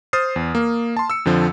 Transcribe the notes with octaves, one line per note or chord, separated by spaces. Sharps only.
C5 D#6 F6 A6 C7
E2
A#3
A5 C6
E6 C#7
F2 D3 F3